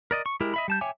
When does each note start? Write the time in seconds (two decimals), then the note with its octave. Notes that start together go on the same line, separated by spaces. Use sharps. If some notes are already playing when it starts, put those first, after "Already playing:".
0.11 A#4 D5 D#5
0.26 C#6
0.40 G#3 E4 G4 A#4
0.54 D#5 E5 B5
0.68 G3 A5 G6
0.81 C#5 E5 G5 G#5 D6